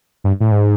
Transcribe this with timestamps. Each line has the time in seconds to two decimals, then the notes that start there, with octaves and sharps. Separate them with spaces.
0.24 G2
0.40 A2
0.51 G#2